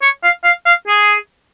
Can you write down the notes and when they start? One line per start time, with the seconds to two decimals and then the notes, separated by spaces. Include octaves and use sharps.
0.02 C#5
0.23 F5
0.44 F5
0.66 F5
0.88 G#4